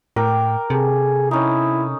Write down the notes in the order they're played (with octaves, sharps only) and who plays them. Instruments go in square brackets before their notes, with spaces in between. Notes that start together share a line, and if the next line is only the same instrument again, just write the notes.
[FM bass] A2 [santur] A#4 G5 D6
[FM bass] C3 [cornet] G#4 [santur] A4
[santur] C#4 D#4 [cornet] E4